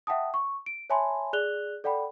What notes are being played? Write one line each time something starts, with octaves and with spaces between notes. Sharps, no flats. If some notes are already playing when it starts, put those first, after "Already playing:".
E5 F#5 G5 A5 D#6
C#6
D7
C#5 E5 G#5 A5 B5 C6
G#4 D5 F#6 F7 G7
A4 D5 F#5 G5 B5